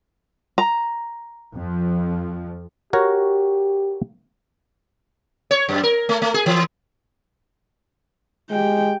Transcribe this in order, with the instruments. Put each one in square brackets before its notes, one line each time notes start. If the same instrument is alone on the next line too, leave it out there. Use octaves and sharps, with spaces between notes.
[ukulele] A#5
[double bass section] F2 F3
[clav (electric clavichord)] F#4 A#4 C#5 [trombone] G4
[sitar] C#5
F#2
A#4
A3
A3
G#4
E3
[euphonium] G#3 [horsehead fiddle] G4 G5